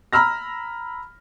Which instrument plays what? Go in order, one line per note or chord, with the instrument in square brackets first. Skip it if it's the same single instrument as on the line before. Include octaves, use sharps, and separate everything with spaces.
[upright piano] A#5 B5 E6 F6 A#6